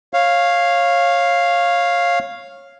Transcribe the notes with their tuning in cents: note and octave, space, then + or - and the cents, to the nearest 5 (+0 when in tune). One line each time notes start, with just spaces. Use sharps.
C#5 -15 F5 +0